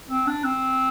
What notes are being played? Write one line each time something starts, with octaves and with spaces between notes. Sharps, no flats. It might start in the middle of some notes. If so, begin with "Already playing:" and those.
C4
D4
C4